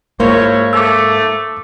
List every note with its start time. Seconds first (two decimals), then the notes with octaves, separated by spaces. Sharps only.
0.20 G#2 A#3 E4 F4 C5 C#5
0.73 A3 D6 E6